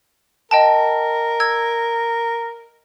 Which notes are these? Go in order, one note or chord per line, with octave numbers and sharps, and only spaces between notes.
A#4 D#5 G5 A5
E6 G#6